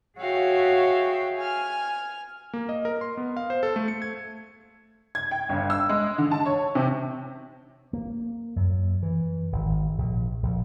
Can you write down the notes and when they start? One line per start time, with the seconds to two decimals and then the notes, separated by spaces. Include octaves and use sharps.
0.18 F#4 G#4 C#5 E5 F5 G5
1.36 G#5 F6
2.53 A#3
2.69 D#5
2.85 A#4
3.01 C6
3.17 B3
3.37 F5
3.50 C5
3.63 A4
3.76 A3
3.88 C#7
4.02 G#6
5.15 G#6
5.31 G5
5.49 G1
5.70 E6
5.89 G#3
6.18 D3
6.31 A5
6.46 C#5
6.75 C3
7.93 A#3
8.56 F#2
9.03 E3
9.52 G#1
9.98 A#1
10.43 A#1